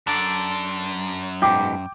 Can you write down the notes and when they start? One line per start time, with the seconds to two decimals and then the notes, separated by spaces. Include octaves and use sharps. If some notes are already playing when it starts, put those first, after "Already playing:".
0.07 F#2 D4 A4 D5
1.42 G#2 B2 G5 D6